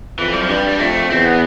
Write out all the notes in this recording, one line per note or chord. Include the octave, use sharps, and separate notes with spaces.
F2 E3
G3
F3
G2 G3
G3
F2 A3
E2 C4
B3